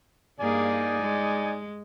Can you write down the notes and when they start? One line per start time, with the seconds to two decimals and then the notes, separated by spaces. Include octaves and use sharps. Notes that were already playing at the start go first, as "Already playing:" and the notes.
0.40 G2 A#3 D#4 G#4 D5 G#5
1.01 G#3